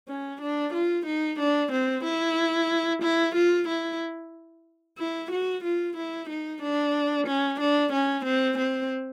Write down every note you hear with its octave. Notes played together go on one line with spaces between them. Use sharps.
C#4
D4
F4
D#4
D4
C4
E4
E4
F4
E4
E4
F#4
F4
E4
D#4
D4
C#4
D4
C#4
C4
C4